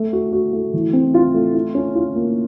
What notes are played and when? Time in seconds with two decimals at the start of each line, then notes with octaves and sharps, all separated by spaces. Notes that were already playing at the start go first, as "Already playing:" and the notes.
Already playing: A3
0.13 F#4
0.33 F#4
0.53 A3
0.74 E3
0.93 C4
1.14 F4
1.34 A3
1.54 F4
1.75 C#4
1.95 F4
2.15 A#3